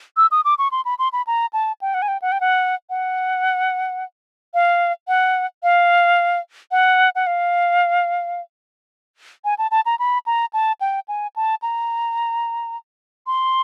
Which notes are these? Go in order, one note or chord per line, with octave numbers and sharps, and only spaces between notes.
E6
D#6
D6
C#6
C6
B5
C6
B5
A#5
A5
G5
F#5
G#5
G5
F#5
G5
F#5
F#5
F5
F#5
F5
F#5
F#5
F5
G#5
A5
A5
A#5
B5
A#5
A5
G5
G#5
A5
A#5
C6